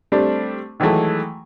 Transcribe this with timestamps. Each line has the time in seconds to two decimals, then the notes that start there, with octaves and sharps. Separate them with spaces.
0.12 G3 A3 C4 D4
0.80 D#3 E3 F#3 G#3 A3